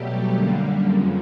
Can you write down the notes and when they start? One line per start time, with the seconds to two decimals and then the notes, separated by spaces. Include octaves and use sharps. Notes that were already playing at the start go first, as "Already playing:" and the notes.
Already playing: B2 F#3 G3 A3 G4
0.35 F#2 D3 G3 A#3
0.89 F2 C#3 F3